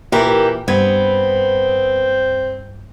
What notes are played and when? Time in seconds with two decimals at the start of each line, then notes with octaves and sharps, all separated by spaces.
0.12 A#2 E3 E4 G4 A#4
0.68 G2 B3 C4 G#6